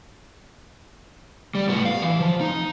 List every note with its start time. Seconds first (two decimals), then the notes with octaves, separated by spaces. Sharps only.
1.55 G3
1.68 A2 B3
1.85 F5
2.02 E3
2.20 F3
2.41 D#4